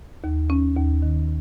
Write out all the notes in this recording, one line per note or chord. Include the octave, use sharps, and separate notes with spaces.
D#2
C#4
D#2
D#3